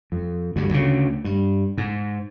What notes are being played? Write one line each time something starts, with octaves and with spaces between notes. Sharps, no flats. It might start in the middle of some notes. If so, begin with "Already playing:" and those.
F2
D2 G2
D2 C#3
G2
G#2